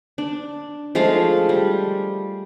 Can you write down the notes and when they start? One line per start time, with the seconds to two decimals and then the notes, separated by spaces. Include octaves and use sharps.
0.18 D4
0.95 F3 G#3 A3 F5
1.49 G3